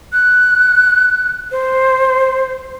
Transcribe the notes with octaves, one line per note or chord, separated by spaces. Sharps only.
F#6
C5